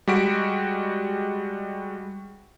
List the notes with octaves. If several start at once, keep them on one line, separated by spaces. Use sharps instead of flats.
G3 G#3 F#4 B6 D7